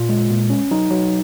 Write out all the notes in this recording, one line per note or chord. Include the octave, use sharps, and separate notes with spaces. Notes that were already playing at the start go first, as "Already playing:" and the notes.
Already playing: A#2 F4
G#3
A#2
C#4
F#3 D#4
F#3